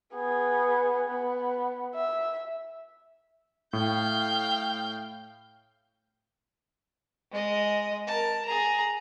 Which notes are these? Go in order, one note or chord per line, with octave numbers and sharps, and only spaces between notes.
B3 G#4
B3
E5
A2 F5 G5 G6
G#3 D#5
A#4 A5
G#4 A#5